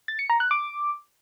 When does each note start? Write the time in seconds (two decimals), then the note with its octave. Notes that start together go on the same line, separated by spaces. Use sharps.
0.08 A6
0.19 C#7
0.30 A#5
0.40 F#6
0.51 D6